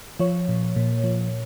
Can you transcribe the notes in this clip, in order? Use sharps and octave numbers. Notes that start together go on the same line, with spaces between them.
F3 C#5
A#2
A#2
F3